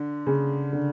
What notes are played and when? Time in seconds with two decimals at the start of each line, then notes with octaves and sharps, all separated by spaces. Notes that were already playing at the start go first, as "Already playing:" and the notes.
Already playing: D3
0.27 C#3
0.73 D3